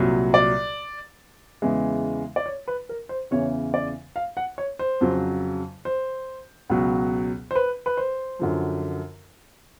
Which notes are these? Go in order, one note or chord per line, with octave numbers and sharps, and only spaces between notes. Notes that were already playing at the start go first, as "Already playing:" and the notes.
Already playing: C2 A#2 F#3
D5
E2 C#3 E3 G#3
D5
C#5
B4
A#4
C5
E2 C#3 E3 C#5
D5
F5
F#5
C#5
C5
F2 C#3 F#3
C5
C#2 B2 F#3
C5
B4
B4
C5
F#2 D3 F3